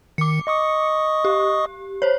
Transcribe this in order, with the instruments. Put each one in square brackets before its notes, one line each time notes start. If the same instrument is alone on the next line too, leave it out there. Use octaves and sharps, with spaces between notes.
[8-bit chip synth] D#3 [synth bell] D6 C#7
[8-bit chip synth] D#5 C#6 D#6
[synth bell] G4
C5 C#5